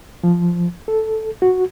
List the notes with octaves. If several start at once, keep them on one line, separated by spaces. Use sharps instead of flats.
F3
A4
F#4